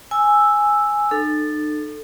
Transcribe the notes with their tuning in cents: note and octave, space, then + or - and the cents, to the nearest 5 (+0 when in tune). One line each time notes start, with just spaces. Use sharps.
G#5 +0 E6 +0
D#4 -45 A4 +0